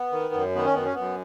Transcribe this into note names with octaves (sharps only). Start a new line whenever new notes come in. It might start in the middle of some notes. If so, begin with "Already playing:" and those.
Already playing: B3
D#3
F#2
D#3 B3
C#4
F#2 B3
C#4
F#2 B3